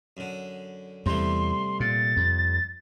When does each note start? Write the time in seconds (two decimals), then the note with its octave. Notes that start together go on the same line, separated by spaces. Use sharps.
0.17 F#2 D3
1.06 E2 C3 G3 A3 C6
1.80 A#2 A6
2.17 F2